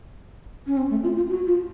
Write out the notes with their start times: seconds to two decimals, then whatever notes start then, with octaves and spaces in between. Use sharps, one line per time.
0.67 C#4
0.77 C4
0.90 A3
1.03 F4
1.16 F4
1.29 F#4
1.47 F4